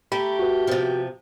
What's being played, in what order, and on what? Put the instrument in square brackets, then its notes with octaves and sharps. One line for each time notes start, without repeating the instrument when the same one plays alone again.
[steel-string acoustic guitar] A3 [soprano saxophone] G4 [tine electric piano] A#5 B5
[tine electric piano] F#4 B4
[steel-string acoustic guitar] C3 F3